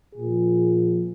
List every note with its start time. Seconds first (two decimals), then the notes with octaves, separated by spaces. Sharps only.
0.16 A#2 F3 G#4